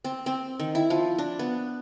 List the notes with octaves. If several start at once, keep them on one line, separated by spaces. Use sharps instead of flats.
C4
C4
D#3
E4
F3
D4
B3